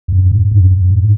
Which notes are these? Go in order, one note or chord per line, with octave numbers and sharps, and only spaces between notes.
F2
F#2
G#2
F#2
F#2
G#2